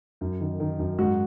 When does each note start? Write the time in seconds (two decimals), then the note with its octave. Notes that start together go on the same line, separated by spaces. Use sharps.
0.21 F#2
0.41 D#3
0.60 D#3
0.79 F#2
0.98 G#2 F#4